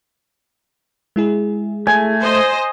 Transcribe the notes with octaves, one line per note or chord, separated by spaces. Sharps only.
G#3 E4 G#4
A3 G#5
C5 D#5